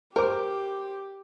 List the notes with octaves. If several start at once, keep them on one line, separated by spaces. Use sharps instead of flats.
G4 A#4 C5 D6